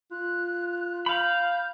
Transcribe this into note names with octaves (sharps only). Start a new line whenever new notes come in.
F4 F#6
F5 B5 G6